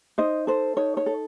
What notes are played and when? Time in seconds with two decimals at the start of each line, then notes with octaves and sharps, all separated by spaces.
0.18 D#4 C5 D#5
0.47 A4 C5
0.77 D#4 C#5
0.97 C#5
1.06 A4